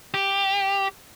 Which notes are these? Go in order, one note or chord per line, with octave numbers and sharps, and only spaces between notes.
G4